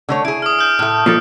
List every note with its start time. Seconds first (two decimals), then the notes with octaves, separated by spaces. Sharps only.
0.09 D3 A3 C#5
0.25 E4 G#4 D7
0.42 D#6 F6
0.59 F6 G6 E7
0.79 A2 A3
1.06 A#2 F3 A4